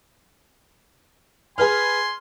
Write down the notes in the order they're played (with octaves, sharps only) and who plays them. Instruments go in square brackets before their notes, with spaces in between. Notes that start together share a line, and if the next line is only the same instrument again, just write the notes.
[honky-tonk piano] G#4 B4 F6 [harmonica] G#5 C6